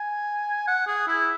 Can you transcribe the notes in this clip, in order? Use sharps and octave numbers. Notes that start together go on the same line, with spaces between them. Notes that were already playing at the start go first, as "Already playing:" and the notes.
Already playing: G#5
F#5
G#4
E4